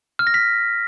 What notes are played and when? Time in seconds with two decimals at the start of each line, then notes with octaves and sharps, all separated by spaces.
0.19 F6
0.27 A#6
0.34 B6